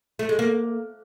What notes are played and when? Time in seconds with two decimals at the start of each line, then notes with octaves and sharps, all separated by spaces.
0.19 A3
0.29 G#3
0.39 A#3